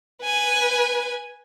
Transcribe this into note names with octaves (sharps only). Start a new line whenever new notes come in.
B4 G#5